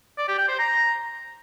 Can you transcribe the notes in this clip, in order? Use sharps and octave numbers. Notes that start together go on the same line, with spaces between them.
D5
G4
G5
C5
A#5